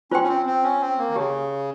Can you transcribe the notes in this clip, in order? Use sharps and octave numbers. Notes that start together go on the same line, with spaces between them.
C#4 F4 C5 G5 C6
C#4
C4
C4
C#4
C4
A#3
D#3
C#3 G4 C#5 G#5